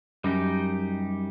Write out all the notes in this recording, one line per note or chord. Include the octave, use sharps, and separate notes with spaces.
F#2 G3 D#4 G4